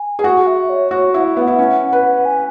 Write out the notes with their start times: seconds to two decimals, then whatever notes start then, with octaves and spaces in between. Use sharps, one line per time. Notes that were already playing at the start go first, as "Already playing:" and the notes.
Already playing: G#5
0.19 G#4
0.24 F#4 F#5
0.47 E5
0.70 C#5
0.91 F#4 C#5
1.14 E4 F#5
1.24 E5
1.37 B3 F#5
1.47 E4
1.59 C#4
1.93 B4
2.25 G#5